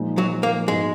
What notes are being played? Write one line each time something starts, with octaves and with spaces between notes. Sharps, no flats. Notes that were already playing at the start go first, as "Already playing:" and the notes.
Already playing: A#2 F3 G#3 D#4
F#3
A#3
G#2 F3 G#3 B3 D#4 F#4